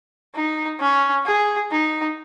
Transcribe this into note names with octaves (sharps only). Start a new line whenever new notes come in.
D#4
C#4
G#4
D#4